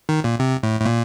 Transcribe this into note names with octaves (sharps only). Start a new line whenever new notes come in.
D#3
A#2
C3
A2
A2
A#2